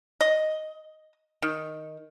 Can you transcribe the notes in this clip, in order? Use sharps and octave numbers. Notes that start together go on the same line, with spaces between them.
D#5
D#3